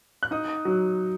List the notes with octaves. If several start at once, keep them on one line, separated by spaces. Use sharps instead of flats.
F#6
D#4 D#6
F#3